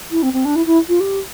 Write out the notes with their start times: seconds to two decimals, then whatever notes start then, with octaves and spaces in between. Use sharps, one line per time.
0.11 E4
0.23 C4
0.33 C4
0.45 D4
0.56 E4
0.66 E4
0.89 F4
1.00 G4